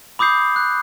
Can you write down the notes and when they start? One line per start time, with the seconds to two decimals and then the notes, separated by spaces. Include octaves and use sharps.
0.19 B5 D6 D#6 G6 C7
0.56 F#6